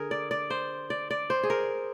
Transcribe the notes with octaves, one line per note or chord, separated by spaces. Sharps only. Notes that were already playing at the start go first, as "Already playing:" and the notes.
Already playing: D3 G#4 A#4
D5
D5
C5
D5
D5
C5
G#4
A#4